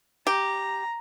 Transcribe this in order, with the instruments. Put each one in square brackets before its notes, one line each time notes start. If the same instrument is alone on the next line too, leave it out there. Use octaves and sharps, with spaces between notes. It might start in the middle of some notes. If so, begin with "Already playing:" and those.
[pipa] G4 [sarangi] A#5